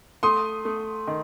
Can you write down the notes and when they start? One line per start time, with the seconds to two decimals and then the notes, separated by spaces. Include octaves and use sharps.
0.23 A3 C6 D#6
0.65 A3
1.07 D#3